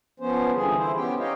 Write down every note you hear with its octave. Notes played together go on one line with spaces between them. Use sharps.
F3 B3 C#4 C5
D3 E3 F3 G3 G#4
E4 C5
B3 C#4 G4 G5
D#4 G4 C#5 D#5 F5 G5